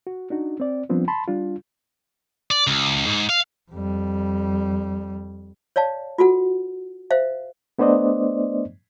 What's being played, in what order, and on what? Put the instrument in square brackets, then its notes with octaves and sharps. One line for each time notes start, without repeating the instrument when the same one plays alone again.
[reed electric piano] F#4
D4 D#4 F#4
C4 D5
F3 G3 B3 C4 D4 F4
A5 B5 C6
G3 D4 F4
[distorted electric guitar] D5
C#2
G#2
F5
[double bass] F2 G3
[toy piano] C#5 D5 F5 A5
F4 F#4 A4 F#5
C5 E5 F5
[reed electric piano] A3 B3 D4 C5 D5 D#5